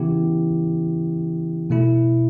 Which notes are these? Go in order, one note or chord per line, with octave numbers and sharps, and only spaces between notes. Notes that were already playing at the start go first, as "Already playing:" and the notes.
Already playing: C#3 E3 B3 E4 G4
B2 A3 E4